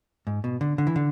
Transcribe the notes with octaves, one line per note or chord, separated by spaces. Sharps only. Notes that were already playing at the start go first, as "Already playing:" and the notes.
G#2
B2
D3
D3
E3
D3